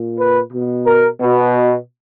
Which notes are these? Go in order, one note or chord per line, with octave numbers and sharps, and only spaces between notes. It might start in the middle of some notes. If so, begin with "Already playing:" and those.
Already playing: A#2
B4
B2
A#4
B2